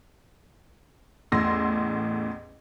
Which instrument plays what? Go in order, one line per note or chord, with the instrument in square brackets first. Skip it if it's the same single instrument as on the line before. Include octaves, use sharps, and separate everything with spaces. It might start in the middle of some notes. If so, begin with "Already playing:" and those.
[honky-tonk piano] A1 E2 A2 C6 E6 A#6